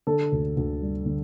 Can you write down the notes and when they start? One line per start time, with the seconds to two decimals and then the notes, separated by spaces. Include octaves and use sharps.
0.07 D3 A4
0.32 D2
0.57 D2
0.82 G3
1.06 D3